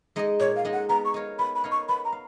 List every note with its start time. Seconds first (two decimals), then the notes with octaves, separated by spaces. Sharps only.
0.16 G#3 D#4 G#4 D#5
0.40 A#2 C#5
0.56 F5
0.65 G#3 D#4 G#4 D#5
0.73 F#5
0.89 B3 A#5
1.05 C#6
1.14 D#4 A#4 C#5 F5
1.39 B3 B5
1.55 B5
1.64 D#4 A#4 C#5 F5
1.72 C#6
1.89 B3 B5
2.05 A#5
2.12 F5